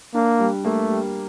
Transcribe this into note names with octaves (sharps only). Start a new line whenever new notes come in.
A#3 D4
G3
A3 A#3
G3